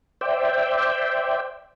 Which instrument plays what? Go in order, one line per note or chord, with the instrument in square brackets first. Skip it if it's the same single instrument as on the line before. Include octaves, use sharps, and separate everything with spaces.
[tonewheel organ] C5 D5 E5 G5